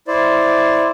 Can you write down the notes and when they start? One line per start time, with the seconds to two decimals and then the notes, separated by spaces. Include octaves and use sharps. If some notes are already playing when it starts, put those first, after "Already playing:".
0.08 E4 C5 D5